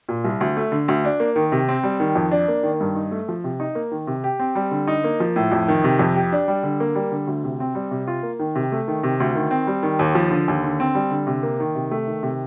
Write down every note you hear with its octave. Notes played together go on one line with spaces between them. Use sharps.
A#2
C2
D2
A3
D3
D2
D4
A#3
D#3
C3
C4
G3
D#3
F2
D4
A#3
D#3
G2
D#4
A3
F3
C3
D#4
A#3
D#3
C3
G4
C4
G3
D3
D#4
A#3
F3
A2
F2
D#3
C3
F2
G4
D4
G3
D3
A#3
G3
D3
D2
C3
C4
G3
C3
F4
A#3
D#3
C3
A3
D#3
C3
D2
D#3
C4
G3
D#3
D#2
F3
D3
D#2
D3
C4
G3
D3
C3
A#3
D#3
C3
A3
D#3
C3